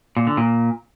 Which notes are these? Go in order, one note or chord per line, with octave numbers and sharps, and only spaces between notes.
A#2
D3
A#2